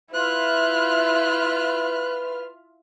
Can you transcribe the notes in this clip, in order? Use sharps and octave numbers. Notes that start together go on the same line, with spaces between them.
E4 F4 B4 E5 F6 F#6